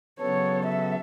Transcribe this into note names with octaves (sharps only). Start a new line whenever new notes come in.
C#3 F#3 B3 A4 C#5
E5